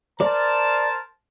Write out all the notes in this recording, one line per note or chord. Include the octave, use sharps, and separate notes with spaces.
A#4 C5 D5 A5